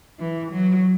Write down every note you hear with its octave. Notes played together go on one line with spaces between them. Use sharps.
E3
F#3